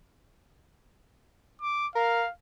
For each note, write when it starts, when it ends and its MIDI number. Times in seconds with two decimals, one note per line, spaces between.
1.61 1.87 86
1.95 2.23 70
1.95 2.31 77